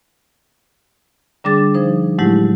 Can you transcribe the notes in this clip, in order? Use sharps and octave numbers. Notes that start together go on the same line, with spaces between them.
D3 G3 D4 G#4 D6 A6
F3 D#4 C5
A2 F#3 G#3 A3 E4 G4